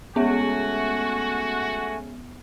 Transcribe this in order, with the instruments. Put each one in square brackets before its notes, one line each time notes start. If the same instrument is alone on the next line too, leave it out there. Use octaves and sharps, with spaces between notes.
[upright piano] G#3 C#4 [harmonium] A3 G#5 [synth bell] B3 E5 [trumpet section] F#4